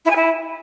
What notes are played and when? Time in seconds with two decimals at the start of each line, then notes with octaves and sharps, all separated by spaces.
0.05 E4
0.10 G#5
0.15 E4